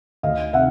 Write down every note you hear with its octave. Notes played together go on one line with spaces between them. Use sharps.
D2 D#5 F5
C3 E5 F#5